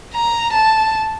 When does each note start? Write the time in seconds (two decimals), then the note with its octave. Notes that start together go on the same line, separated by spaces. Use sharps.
0.14 A#5
0.53 A5